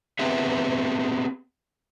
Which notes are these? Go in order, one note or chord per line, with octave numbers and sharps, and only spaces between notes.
B3 C4 G4 G#4 B4 E5